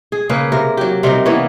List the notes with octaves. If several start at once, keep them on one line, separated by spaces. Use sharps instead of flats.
G#4
C#3 A#3 G#4 B4
C3 A#4
F#3 G4
C3 G3 D#4 A#4
E3 A#3 B3 C#4